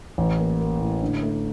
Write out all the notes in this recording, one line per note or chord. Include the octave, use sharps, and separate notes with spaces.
A1
A#3
A#3
A2
D3
A3